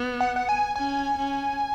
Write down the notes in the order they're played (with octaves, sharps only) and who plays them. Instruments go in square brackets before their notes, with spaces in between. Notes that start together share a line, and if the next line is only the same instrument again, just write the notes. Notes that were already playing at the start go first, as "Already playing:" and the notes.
Already playing: [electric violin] B3
[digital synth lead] F#5
F#5
G#5
[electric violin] C#4 [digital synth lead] G#5
[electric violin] C#4